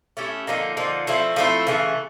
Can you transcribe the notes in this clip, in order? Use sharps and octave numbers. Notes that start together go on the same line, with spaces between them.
A3 C#4 E4 G4
D3 F3 A#3 D#4
D3 F3 A#3 D#4
F3 A3 C4 E4
F3 A3 C4 E4
C#3 E3 A3